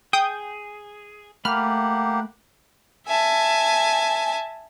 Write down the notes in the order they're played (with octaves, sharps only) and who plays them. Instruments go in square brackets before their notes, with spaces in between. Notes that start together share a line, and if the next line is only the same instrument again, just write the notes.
[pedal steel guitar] G#4 [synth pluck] G5 D#6 G6
[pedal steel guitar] A3 B5 [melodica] A#3 G4 F#5 [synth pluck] F6
[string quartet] E5 G#5 A5